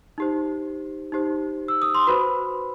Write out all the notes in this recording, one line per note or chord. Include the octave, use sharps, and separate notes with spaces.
D#4 G4 C5
D#4 G4 C5
E6
D#6
C6
F#4 B4 C5 B5